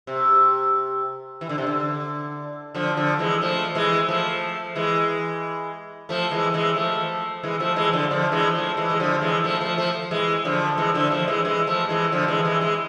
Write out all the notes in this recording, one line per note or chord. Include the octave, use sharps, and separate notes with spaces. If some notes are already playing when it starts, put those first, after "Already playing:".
C3
E3
D3
C3
D3
D3 F3
D3 F3
E3 G#3
F3 A3
E3 G#3
F3 A3
E3 G#3
F3 A3
E3 G#3
E3 G#3
F3 A3
E3 G#3
F3 A3
E3 G#3
D3 F3
D3 F3
E3 G#3
F3 A3
E3 G#3
G#3
D3 F3
E3 G#3
F3 A3
F3 A3
F3 A3
E3 G#3
D3 F3
E3 G#3
D3 F3
F3 A3
E3 G#3
E3 G#3
F3 A3
E3 G#3
D3 F3
E3 G#3
E3 G#3
E3 G#3